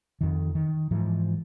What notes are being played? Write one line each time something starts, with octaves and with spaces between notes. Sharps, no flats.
F2 D#3
D#3
G#2 E3 F3